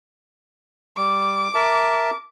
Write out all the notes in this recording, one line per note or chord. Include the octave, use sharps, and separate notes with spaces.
G3 D6
A#4 E5 A5